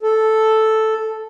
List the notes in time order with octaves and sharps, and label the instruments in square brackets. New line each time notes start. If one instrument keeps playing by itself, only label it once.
[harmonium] A4